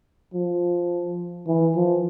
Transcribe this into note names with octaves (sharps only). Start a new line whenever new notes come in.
F3
E3
F3